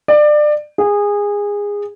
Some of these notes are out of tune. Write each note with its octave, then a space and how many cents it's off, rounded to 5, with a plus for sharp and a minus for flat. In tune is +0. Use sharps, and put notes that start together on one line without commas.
D5 +25
G#4 -20